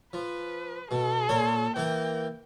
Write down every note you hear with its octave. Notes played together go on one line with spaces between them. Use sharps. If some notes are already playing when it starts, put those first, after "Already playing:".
F3 B4
B2 A4
A#2 C#5 G#5
E3 A#3 A#4 G5